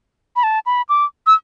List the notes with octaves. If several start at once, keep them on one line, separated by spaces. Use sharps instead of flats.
B5
A5
B5
D6
E6